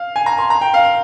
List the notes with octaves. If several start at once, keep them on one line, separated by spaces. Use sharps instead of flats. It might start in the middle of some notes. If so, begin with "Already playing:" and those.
Already playing: F5
G#5
A#5
C6
A#5
G5
F5